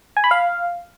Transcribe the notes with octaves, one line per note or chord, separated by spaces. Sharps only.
G#5
B5
F5